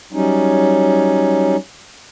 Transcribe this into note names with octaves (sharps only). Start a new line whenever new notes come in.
F#3 G3 C#4 D#4